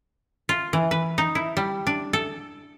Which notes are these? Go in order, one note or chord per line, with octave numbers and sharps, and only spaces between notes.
F4
E3
B4
D#4
E4
G3
D4
A4